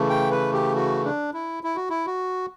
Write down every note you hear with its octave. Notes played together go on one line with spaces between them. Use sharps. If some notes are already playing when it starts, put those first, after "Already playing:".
Already playing: C#3 E3 A3
G5
B4
G4
F#4
D4
E4
E4
F#4
E4
F#4